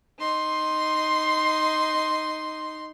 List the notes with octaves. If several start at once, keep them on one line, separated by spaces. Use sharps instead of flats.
D#4 C6